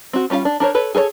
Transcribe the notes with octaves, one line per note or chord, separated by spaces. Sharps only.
C4 F#4
G3 C#4 F4 A4 F5
D4
D4 A#4 C5 C#5
A4 B4 C#5
G#4 A4 C5 C#5